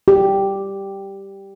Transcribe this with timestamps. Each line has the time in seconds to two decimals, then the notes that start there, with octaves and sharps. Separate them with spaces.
0.08 G4